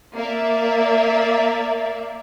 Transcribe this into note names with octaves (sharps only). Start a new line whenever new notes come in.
A#3 D5 E5